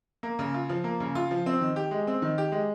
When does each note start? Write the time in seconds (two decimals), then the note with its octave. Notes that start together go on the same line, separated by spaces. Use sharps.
0.23 A#3
0.39 C#3
0.54 F4
0.69 F3
0.84 A#3
1.00 C#3
1.15 F4
1.31 F3
1.46 C4
1.61 D#3
1.76 G4
1.91 G#3
2.07 C4
2.22 D#3
2.38 G4
2.52 G#3